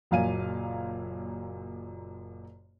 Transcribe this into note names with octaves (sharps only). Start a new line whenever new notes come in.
F#1 F#2 A#2 F5 G#5 D#7